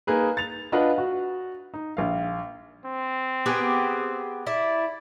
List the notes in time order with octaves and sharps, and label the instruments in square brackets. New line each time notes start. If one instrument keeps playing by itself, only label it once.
[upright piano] A#3 D#4 G#4 B4
A6 F7
D4 F4 B4 D#5 F#5
F#4
D#4
A#1 F5
[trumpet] C4
[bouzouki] B3 G4 G#4
[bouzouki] E4 [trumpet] D5